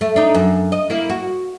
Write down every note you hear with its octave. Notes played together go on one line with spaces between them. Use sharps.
A3
D4 D#4
F#2
D#5
A#3 E4
F#4